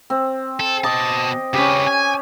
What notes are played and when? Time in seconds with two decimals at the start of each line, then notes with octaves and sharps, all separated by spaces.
0.10 C4
0.60 A4
0.84 B2 C5 D#5 A5 D6
1.54 C#3 C#4 G4 B4
1.87 G#5